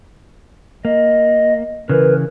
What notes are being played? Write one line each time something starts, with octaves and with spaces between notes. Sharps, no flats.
A#3 D#5
C#3 E3 A#4 B4